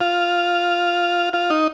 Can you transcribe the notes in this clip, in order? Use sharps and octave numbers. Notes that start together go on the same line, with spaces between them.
F4
F4
D#4